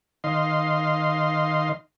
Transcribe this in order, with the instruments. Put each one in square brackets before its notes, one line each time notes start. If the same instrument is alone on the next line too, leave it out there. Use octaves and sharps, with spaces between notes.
[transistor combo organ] D#3 D#5 F5 C6